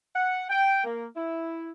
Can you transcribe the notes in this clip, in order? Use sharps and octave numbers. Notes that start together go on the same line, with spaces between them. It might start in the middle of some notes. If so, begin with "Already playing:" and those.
F#5
G5
A#3
E4